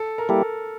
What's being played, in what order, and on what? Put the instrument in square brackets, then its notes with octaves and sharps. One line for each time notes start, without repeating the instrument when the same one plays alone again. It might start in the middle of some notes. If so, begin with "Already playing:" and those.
Already playing: [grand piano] A4
A#4
[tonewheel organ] G3 A#3 E4 G4 [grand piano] A4